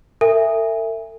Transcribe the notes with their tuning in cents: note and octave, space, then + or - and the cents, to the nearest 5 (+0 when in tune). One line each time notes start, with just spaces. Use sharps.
A4 +45 E5 +5 G#5 -25